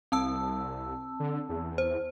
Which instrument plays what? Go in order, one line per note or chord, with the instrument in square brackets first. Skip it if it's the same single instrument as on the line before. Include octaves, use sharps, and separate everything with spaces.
[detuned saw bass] C2 [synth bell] C4 A5 E6
[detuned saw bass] D3
E2
[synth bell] C5